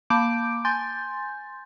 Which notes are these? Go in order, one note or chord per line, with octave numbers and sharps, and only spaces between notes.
A#3 A5 B5 D6 G6 D7
G#5 C6 G6 A6